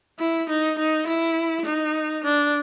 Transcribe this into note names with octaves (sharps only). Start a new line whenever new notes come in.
E4
D#4
D#4
E4
D#4
D4